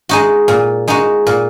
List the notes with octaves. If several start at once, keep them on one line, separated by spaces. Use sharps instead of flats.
G#3 D#4 F#4
A#2
G#3 D#4 F#4
A#2